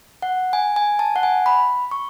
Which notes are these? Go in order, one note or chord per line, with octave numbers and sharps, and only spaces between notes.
F#5
G#5
G#5
A5
F#5
G#5
B5
C#6